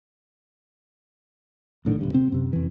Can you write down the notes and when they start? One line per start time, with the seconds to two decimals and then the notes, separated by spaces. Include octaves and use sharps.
1.85 B1 A2 D3 D#3
1.99 E1 G2 D3
2.13 C3 C4
2.32 F#2 C3
2.53 F2 E3